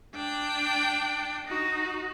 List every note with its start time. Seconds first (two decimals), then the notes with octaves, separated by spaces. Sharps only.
0.15 D4 G5
1.47 D#4 F#4